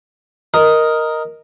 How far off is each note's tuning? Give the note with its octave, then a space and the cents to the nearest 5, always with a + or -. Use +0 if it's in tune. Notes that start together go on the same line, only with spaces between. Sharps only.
A#4 +0 D#5 +0